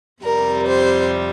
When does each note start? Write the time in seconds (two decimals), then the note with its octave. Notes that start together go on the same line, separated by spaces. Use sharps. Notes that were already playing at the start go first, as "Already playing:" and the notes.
0.22 F2 C3 G3 A#4
0.66 C5